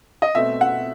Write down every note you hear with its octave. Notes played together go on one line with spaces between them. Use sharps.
D#5
B2 A3 C4 E5
F#5